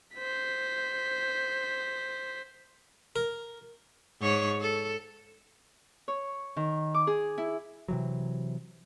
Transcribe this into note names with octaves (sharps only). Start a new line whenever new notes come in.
C5 B6
A#4
G#2 C#5
A4
C#5
D#3
D6
G#4
E4
C3 E3 F#3